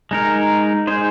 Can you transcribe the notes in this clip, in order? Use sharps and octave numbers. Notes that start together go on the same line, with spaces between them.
G#3 D#4 A#4
G#3 D#4 G#4 C5